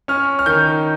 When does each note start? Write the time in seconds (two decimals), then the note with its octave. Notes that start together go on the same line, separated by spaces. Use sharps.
0.08 C#4 F6
0.39 F6
0.46 D#3 G6